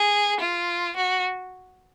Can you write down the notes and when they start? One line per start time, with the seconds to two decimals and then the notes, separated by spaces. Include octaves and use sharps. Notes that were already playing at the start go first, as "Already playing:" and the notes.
Already playing: G#4
0.41 F4
0.96 F#4